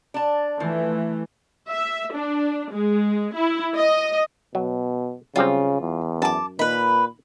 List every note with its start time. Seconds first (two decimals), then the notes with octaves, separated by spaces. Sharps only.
0.14 D4 A5
0.60 E3 F3 A3
1.67 E5
2.13 D4
2.72 G#3
3.35 E4
3.76 D#5
4.55 B2 F#3
5.36 C#3 F#3 G3 C4 F4
5.81 E2
6.22 F#2 A5 D6
6.59 A#2 D#3 B4 B5